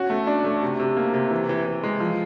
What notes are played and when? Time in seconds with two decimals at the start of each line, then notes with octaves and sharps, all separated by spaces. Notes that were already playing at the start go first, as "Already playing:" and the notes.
Already playing: C#4 F#4
0.10 A3
0.27 D4
0.44 A3
0.62 C3
0.80 C3
0.97 A#3
1.14 C3
1.31 E3
1.49 E3
1.66 E3
1.83 G#3
2.00 F3